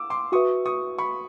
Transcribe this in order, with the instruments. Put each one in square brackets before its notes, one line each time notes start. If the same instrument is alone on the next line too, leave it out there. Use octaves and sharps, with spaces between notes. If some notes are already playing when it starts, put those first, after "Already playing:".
Already playing: [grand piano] D6 E6
C6 D6
[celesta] F#4 B4 E5 [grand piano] C#6 D#6
[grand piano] C#6 D#6
B5 C#6